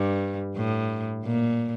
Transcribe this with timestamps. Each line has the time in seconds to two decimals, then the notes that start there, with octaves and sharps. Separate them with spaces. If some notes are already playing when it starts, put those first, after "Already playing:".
Already playing: G2
0.56 A2
1.25 A#2